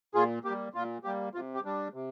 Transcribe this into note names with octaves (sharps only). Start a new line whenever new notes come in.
A#2 F4 G#4
G3 A#3 G4
A#2 F4
G3 A#3 G4
C3 F4
G4
G3 D4
C3